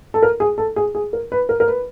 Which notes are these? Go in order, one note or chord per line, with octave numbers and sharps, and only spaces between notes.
A4
A#4
G#4
A4
G#4
G#4
A#4
B4
A#4
A#4
B4